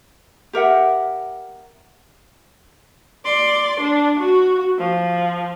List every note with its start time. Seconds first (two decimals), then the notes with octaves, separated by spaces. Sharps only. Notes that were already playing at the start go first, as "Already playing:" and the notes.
0.53 G4 A#4 E5 F#5
3.25 D5 C6
3.80 D4
4.19 F#4
4.78 F3